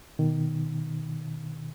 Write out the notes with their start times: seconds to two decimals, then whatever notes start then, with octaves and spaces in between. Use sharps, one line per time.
0.19 B2 D#3